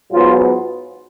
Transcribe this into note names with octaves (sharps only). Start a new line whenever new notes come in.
G#2 F#3 B3 F4